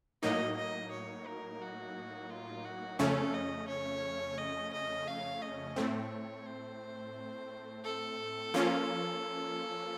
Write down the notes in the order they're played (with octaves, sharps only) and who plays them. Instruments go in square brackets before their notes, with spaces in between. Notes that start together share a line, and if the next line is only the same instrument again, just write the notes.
[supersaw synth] A2 F#3 A#3 D#4 [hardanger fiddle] D#5
[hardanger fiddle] D#5
C#5
A#4
F#4
F4
F#4
[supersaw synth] F2 C#3 A3 C#4 [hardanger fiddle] A4
[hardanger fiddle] D#5
C#5
D#5
D#5
F5
D#5
[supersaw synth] A2 A3 C4 [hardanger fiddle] C#5
[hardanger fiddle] C5
A4
[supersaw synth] F3 A#3 C#4 F4